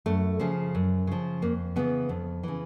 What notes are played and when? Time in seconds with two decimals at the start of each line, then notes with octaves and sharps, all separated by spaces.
0.06 F#2 A3
0.40 C#3 F3
0.75 F#2
1.07 C#3 F3
1.42 F2 A#3
1.76 C#3 E3 B3
2.09 F2
2.43 C#3 E3